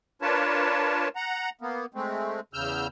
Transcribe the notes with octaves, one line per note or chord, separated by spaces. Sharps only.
D4 F4 A#4 B4 C#5 A5
F#5 A#5
A#3 B3
G#3 A3 C4
E2 C#3 E6 F6 G6